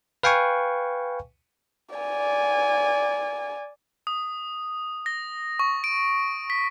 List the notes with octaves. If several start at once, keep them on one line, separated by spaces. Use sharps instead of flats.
B4 F5 G5 G#5 C#6
D5 G#5
D#6
A#6
C#6
D7
B6